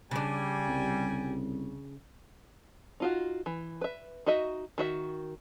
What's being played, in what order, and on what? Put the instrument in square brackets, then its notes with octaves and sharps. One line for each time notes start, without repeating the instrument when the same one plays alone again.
[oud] C#3 D4 [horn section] G3 G#5
[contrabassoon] C2
[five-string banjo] D#4 F4 F#4
E3
B4 E5
D#4 F#4 D#5 E5
D#3 F#4 E5